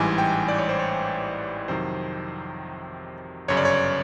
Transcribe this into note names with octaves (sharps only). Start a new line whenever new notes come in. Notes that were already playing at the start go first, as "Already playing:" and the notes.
Already playing: A1 G#2 E3 G3 G#5
G5
D5
C#5
C5
C#5
F2 C3 D#3 F#3 C5
G1 F#2 C#3 C#5
D5
C#5